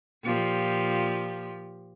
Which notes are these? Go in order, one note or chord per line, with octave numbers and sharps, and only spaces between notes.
A#2 F3 G4